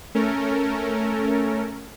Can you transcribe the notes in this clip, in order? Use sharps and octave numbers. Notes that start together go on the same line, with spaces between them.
A3 C#4 A4 A#4